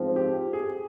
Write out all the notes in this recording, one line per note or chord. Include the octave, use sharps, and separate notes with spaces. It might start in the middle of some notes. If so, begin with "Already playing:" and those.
Already playing: G#2 F3 C4
G4
G#4